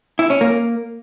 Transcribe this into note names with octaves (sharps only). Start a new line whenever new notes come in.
E4
C#4
A#3